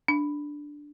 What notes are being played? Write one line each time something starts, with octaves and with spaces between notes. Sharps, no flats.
D4